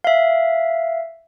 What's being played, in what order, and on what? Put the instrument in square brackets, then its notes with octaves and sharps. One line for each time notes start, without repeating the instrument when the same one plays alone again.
[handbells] E5 F5